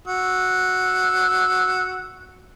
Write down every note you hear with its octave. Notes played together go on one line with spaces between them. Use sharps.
F#4 E6